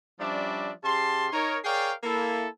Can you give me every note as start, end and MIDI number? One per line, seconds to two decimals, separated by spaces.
0.19 0.71 53
0.19 0.71 55
0.19 0.71 61
0.19 0.71 62
0.19 0.71 74
0.19 0.71 76
0.83 1.27 49
0.83 1.27 67
0.83 1.27 81
0.83 1.27 84
1.32 1.57 63
1.32 1.57 70
1.32 1.57 73
1.64 1.92 68
1.64 1.92 70
1.64 1.92 73
1.64 1.92 74
1.64 1.92 77
1.64 1.92 79
2.03 2.46 58
2.03 2.46 64
2.03 2.46 69